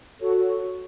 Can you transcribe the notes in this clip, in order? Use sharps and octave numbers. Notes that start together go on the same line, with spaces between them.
F#4 A4 C#5